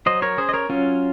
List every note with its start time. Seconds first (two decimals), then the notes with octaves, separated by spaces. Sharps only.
0.06 F#3 C5 D#5
0.22 A#4 C#5
0.37 C#4 G#4 C5
0.49 D#5
0.53 A#4 C#5
0.69 F#3 C#4 F4